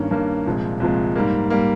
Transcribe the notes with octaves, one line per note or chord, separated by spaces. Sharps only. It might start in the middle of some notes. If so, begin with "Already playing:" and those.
Already playing: G2 D#3 A#3 C#4
G2 D#3 A#3 C#4
C2 A#2 F3 G#3
C2 A#2 F3 G#3
G#2 G3 A#3
G3 A#3